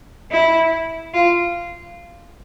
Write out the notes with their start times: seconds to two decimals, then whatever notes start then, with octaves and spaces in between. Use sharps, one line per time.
0.31 E4
1.13 F4